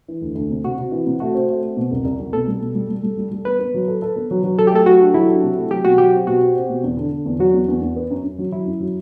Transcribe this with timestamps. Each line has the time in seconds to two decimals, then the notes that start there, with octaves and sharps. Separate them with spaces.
0.08 E3
0.21 D2
0.35 D2
0.50 C3
0.65 C3 F#4
0.78 C3
0.92 E3
1.07 C3
1.20 A3 F#4
1.35 C4
1.49 A3
1.63 C4
1.77 B2
1.91 C2
2.05 C2
2.19 C2
2.33 B2 A4
2.48 G3
2.61 B2
2.75 G3
2.89 G3
3.03 G3
3.18 G3
3.31 G3
3.45 B3 B4
3.59 B3
3.74 F#3
3.87 A4
4.02 A4
4.16 B3
4.31 F#3
4.44 F#3
4.59 F#3 A4
4.67 G4
4.72 A3 A4
4.86 F#3 F#4
5.00 D4
5.14 F#3 E4
5.29 D4
5.43 C3
5.57 A3
5.71 F#3 G4
5.85 B2 F#4
5.98 F#3 G4
6.13 C4
6.27 B2 F#4
6.41 C4
6.56 C4
6.69 B2
6.83 E2
6.97 D3
7.11 D3
7.26 E2
7.39 F#3 F#4
7.54 E2
7.68 E2
7.81 E2
7.96 B3
8.10 F#2
8.24 F#2
8.38 F#3
8.52 F#3 E4
8.66 F#2
8.80 F#3